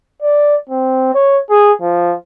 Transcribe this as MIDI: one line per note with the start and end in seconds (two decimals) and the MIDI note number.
0.22 0.55 74
0.70 1.14 60
1.14 1.40 73
1.50 1.72 68
1.82 2.15 53